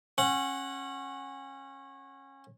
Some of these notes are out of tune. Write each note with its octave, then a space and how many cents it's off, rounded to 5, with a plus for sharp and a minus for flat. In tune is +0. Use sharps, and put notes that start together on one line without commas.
C#4 -25 F#5 +0